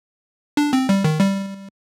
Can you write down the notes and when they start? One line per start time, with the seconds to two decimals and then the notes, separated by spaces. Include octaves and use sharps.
0.57 D4
0.73 C4
0.89 G3
1.04 D#3
1.21 G3